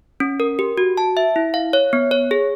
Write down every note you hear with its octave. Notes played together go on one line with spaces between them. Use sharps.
C#4
A#4
G4
F#4
A5
E5
E4
F5
C#5
B3
C#5
G#4